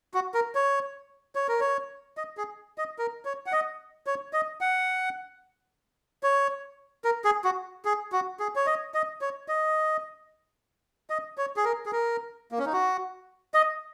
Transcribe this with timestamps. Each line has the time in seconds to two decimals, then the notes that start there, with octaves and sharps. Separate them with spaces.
0.14 F#4
0.34 A#4
0.55 C#5
1.35 C#5
1.48 A#4
1.60 C#5
2.17 D#5
2.37 G#4
2.78 D#5
2.98 A#4
3.25 C#5
3.46 F#5
3.52 D#5
4.07 C#5
4.33 D#5
4.61 F#5
6.23 C#5
7.04 A#4
7.25 G#4
7.44 F#4
7.85 G#4
8.12 F#4
8.40 G#4
8.56 C#5
8.66 D#5
8.94 D#5
9.21 C#5
9.48 D#5
11.10 D#5
11.38 C#5
11.57 G#4
11.64 A#4
11.86 G#4
11.92 A#4
12.52 A#3
12.58 C#4
12.66 D#4
12.73 F#4
13.54 D#5